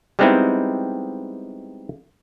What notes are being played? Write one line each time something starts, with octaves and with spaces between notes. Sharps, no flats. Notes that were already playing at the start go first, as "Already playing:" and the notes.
G3 G#3 B3 C4 D#4 E4